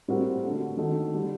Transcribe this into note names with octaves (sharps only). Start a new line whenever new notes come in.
A2 G3 C4 F#4 A#4
D3 F#3 A3
D#3 F#3 A3 D#4 A4
D3 G3 D4